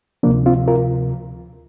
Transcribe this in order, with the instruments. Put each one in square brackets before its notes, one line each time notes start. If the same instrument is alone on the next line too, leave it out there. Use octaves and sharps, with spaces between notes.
[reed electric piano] D2 C3 F3 A#3 D4
C4 F4
F4 A#4